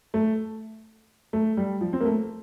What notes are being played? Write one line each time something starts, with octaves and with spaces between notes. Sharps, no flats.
A3
A3
G3
F3
C4
A#3
A3